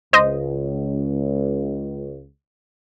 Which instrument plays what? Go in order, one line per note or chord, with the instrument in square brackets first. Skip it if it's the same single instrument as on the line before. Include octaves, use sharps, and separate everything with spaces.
[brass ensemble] C#2 [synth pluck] C5 D#5